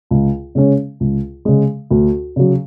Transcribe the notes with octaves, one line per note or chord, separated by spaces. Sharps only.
C#2
C#3 G#3 C#4
C#2
C#3 G#3
D2
C#3 F#3